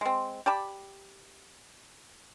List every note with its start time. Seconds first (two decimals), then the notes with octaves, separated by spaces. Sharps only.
0.01 G#3 C4
0.46 G4 D5 A5 B5